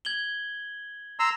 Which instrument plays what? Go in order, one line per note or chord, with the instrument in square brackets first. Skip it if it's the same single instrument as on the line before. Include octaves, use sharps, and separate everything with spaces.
[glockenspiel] G#6 F#7 G7
[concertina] A#5 C6 E6